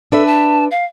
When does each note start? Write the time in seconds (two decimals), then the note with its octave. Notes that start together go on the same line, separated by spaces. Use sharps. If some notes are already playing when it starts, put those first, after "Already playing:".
0.12 D4 A4 B4 E5
0.26 A5
0.71 F5